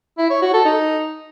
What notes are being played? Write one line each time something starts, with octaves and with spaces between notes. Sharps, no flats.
E4
C#5
F#4
A4
D#4